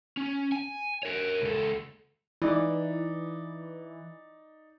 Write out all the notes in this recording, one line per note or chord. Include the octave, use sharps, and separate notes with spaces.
C#4
G#5
A#4 C#5
C#2 A4
E3 D#4 D5